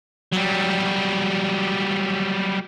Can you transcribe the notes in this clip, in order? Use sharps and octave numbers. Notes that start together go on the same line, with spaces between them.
F#3 G3